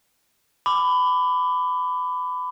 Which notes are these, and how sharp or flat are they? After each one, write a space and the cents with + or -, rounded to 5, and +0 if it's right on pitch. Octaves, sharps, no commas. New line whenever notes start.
B5 +20 D6 +0